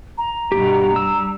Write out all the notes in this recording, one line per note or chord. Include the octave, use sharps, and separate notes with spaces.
A#5
G2 B2 G4
G3 E6